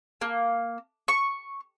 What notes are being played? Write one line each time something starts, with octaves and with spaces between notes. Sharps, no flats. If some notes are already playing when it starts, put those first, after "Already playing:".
A#3
C#6